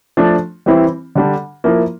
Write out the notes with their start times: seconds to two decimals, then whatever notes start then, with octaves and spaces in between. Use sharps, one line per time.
0.17 F3 A3 D4
0.66 E3 G3 C4 E4
1.15 D3 G3 D4
1.64 F3 A#3 E4